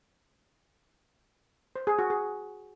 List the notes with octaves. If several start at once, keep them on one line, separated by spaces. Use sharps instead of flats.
C5
G#4
F#4
G#4